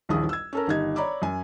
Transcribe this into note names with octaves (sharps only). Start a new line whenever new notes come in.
D#1 A#1 D#2 E4 G#4 D#6
E6 G#6
C#4 A4 A#4
G1 D#3 D#4 G4 G#6
C#5 D5 A#5 B5 D6
F#2 G#5